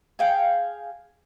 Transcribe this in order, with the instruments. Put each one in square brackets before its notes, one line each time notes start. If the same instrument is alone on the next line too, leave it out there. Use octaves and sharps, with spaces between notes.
[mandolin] G#4 F5 G5